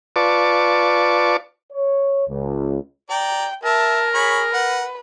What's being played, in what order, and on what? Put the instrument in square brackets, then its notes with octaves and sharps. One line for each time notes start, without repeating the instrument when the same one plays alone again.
[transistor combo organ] F4 B4 D5 A5 C#6 D6
[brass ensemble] C#5
C#2
[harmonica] D5 A#5 [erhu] G5
[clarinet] A#4 [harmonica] E5 [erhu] A5
[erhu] G#4 [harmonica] C#5 B5 C#6
[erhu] B4 [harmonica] F#5